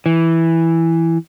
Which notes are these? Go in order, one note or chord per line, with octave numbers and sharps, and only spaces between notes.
E3